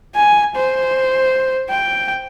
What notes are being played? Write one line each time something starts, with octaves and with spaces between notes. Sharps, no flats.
G#5
C5
G5